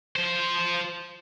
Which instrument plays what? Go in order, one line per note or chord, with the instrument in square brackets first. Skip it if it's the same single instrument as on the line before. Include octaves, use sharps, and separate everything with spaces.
[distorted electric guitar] F3 C5